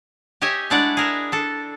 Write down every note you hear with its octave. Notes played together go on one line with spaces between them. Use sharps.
G4 C#5 D#5 E5 G#5
G#3 A3 D4 E4 D5 F#5
G#4 A#4 E5
D4 A4